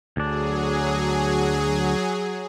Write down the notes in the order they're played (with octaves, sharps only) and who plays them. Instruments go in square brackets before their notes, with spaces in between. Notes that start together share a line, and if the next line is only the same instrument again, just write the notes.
[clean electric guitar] D2 D4 [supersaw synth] F#3 G#4